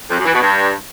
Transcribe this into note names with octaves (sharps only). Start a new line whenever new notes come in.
F2
F#2
E3
B2
G2